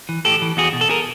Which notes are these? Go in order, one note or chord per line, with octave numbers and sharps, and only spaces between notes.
E3
A2 G4 A4
E3
E2 F#4 G#4
B2
A4
G#4 A#4